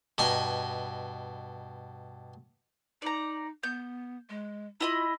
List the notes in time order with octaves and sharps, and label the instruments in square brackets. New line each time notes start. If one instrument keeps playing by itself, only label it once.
[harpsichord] G2 B2 D#5 G#5 A#5
[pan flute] D#4 [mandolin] D5 A#5
[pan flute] B3 [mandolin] G6
[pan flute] G#3
[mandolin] E4 D#5 B5 [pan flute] F4